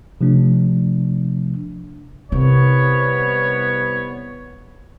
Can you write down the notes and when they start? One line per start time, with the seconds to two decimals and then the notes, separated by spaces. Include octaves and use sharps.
0.21 C3 F3 A3 D4
2.32 C2 C3 B3 C#5